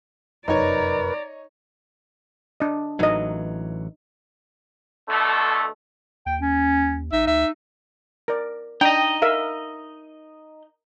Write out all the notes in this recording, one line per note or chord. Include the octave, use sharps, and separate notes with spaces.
F1 F#2 D#4 A#4 B4 C#5 D5 A#5
D4 D#5
A1 E3 F#3 D#4 D#5
B2 D3 A3
D#2 G5
C#4
A1 D#4 E5
D2 E5
A#4 D5
D4 D#4 D#5 G5
A#4 E5 F5